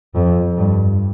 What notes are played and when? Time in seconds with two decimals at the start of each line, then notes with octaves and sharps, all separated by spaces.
0.15 F2
0.58 G2